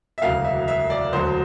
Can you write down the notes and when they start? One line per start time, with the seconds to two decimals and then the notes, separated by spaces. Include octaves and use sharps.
0.18 E5
0.22 E1 D2 C#3 F#3 F5
0.44 E5
0.68 E5
0.90 D5
1.13 E1 D2 D3 F#3 C5